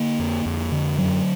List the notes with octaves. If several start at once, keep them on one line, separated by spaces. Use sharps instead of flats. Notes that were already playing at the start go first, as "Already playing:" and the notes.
Already playing: D3 A#3
F2
F2
D3
F#2 F#3